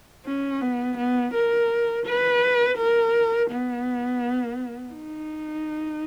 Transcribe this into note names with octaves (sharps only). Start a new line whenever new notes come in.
C#4
B3
B3
A#4
B4
A#4
B3
D#4